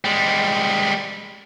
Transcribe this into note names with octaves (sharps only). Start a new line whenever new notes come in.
G3 G#3